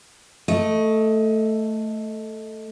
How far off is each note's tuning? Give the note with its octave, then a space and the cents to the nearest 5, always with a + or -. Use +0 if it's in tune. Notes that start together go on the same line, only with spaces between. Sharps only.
A3 +0 D#5 +20